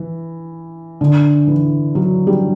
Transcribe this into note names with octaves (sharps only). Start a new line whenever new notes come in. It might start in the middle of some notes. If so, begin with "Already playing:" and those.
Already playing: E3
D3
E3
F#3
G3